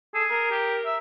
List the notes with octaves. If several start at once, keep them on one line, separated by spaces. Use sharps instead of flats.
G#4 A4
A#4
G4
E5